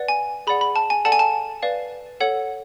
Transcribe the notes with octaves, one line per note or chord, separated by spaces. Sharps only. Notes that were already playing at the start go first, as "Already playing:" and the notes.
Already playing: B4 D5 F#5
G#5
G#4 D5 F#5 B5
B5
A5
G#5
A4 D5 F#5 A5
G#5
A5
B4 D5 F5
A4 C#5 F#5